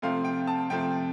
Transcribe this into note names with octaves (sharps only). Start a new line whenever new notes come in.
C3 F3 A3 C4 F5
G5
A5
C3 F3 A3 C4 G5